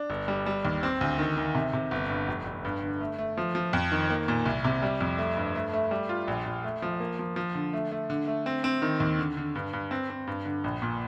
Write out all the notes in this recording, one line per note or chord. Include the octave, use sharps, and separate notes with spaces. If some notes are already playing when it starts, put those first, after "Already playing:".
Already playing: D4
G1
G3
G3
D#2
C4
D2
D#3
D#3
C3
C3
G1
G2
F1
F1
G2
D3
A3
A3
F3
F3
F2
D#3
A#3
A#2
C2
C3
G3
F2
A3
G2
A3
A3
G3
F4
A#1
A#1
A3
F3
A#3
F3
F3
D3
A3
A3
D3
A3
C4
C4
D#3
D#2
D3
D3
G2
G2
C4
C4
G2
D3
A#1
A#2